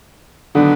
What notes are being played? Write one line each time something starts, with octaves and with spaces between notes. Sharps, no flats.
D3 D#3 F#3 B3 D4